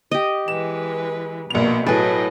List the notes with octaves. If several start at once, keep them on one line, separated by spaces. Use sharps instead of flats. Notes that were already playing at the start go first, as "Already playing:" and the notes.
G4 D#5
E3 G#3 B4 E7
A#1 B2 A#3 F7
A2 F#3 G#4 A4 B4 D#5